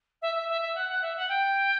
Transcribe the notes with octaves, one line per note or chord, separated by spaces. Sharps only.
E5
E5
E5
E5
F#5
F#5
E5
F#5
G5